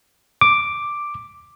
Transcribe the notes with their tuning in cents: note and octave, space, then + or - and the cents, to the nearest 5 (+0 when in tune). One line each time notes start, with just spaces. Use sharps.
D6 +5